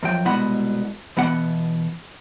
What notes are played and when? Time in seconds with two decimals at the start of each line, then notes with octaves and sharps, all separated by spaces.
0.03 F#2 F3 G5
0.25 C2 B2 G#3 E4 F#5 B5
1.17 B2 E3 B3 F#5